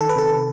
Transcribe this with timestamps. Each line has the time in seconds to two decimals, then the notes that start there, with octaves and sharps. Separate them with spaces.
0.01 D#3 A4
0.09 B4
0.16 C3 A4